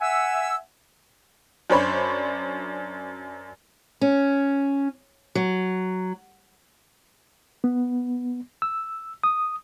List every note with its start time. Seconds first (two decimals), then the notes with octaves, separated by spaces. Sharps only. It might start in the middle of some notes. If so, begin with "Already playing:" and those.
0.01 E5 F#5 G#5 E6
1.70 F#2 D4 C5 C#5 B5
4.01 C#4
5.35 F#3
7.64 B3
8.62 E6
9.24 D#6